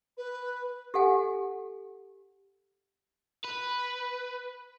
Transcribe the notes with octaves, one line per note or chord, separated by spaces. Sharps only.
B4
G4 A4 F#5 G#5
B4